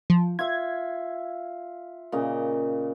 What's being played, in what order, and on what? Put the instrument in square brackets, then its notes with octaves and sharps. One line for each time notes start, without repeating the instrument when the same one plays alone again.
[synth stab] F3
[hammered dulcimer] F4 E5 [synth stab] G#6
[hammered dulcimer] A#2 C#3 D#5